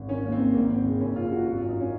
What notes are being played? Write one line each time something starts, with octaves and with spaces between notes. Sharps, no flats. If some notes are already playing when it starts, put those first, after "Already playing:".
Already playing: G#1
D#3 C#4
D#2
C4
D#3
G#1 A#3
G#1 C4
C#3
F#1 C#4
F#1 F4
F#2 F#4
G#1 F#4
F4
F#2
D#4
C#4